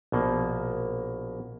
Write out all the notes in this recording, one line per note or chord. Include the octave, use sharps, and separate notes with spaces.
A#1 B2 A#3